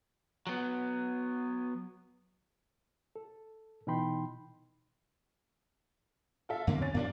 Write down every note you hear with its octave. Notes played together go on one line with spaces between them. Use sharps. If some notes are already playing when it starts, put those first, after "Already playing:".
F#3 B3
A4
B2 E3 D#4 G5 B5 C6
F4 A4 E5
F2 D3 A#3 C4
C#4 A6
F2 A#2 G3 A#3 D4